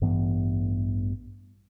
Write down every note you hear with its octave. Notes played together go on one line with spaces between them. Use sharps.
A1 G2 E3 B3